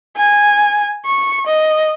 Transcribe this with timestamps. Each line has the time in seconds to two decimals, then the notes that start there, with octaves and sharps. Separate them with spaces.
0.17 G#5
1.06 C#6
1.46 D#5